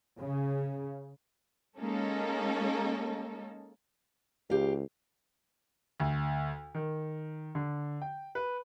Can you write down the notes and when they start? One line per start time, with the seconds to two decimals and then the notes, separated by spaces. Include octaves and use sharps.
0.20 C#3
1.78 G#3 A#3 C#4 D#4 A4
4.50 C#2 G4 F5
6.00 D2
6.75 D#3
7.55 D3
8.02 G5
8.35 B4